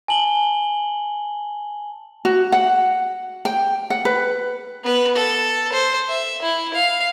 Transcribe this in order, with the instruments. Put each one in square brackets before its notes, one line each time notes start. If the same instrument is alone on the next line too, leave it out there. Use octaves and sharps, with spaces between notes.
[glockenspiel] G#5 A5 F#7 G7
[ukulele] F#4
F#5
G5
F#5
B4
[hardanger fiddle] B3 B4
A4
C5
E5
E4
F5